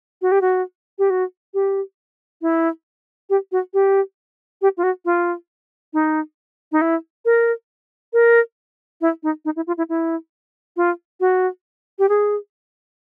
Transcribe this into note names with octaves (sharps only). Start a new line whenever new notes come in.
F#4
G4
F#4
G4
F#4
G4
E4
G4
F#4
G4
G4
F4
F#4
F4
D#4
D#4
E4
A#4
A#4
E4
D#4
D#4
E4
F4
E4
E4
F4
F#4
G4
G#4